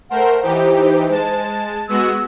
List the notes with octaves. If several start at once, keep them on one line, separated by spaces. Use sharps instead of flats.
A3 A#4 C5 F#5
E3 D#4 G4 C5
G#3 A5
G#3 B3 F#4 E6